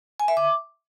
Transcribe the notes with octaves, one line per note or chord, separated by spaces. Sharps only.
G#5
E5
D6